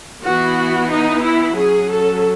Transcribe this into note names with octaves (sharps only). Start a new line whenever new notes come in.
E3 B3 F#4
D#4
E4
F#3 C#4 G#4
A4